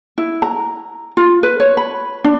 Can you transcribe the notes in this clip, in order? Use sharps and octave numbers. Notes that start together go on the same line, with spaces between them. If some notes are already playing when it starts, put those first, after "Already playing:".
E4
A#5
F4
B4
C#5
B5
D4